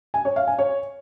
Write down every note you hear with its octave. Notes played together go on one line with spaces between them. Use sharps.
G#5
C#5
F5
G#5
C#5